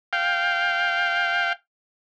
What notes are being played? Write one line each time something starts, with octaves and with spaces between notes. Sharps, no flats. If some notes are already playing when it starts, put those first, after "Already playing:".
F5 G5